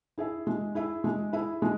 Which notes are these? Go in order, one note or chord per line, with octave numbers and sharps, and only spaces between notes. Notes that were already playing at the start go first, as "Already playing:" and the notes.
E4 G#4 E5
G#3
E4 G#4 E5
G#3
E4 G#4 E5
G#3